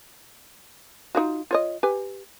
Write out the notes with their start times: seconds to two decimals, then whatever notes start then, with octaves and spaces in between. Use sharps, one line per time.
1.15 D#4 F4 F#4
1.51 F4 C#5 D#5
1.83 G4 B4 G#5